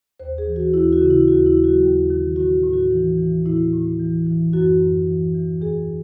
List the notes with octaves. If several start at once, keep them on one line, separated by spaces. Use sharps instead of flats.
D#2 C5
G#4
E3
F#4
D#2 E4
F#4
C#3
E4
D#2 F#4
E4
F#3
F#4
D#2
D#3
A2 F#4
A2
F#4
E3
E3
A2 E4
A2
E3
E3
F#2 F#4
F#2
E3
E3
E2 G#4